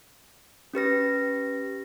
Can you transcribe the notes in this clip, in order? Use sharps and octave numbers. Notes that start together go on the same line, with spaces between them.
C#4 G4 B4 A#6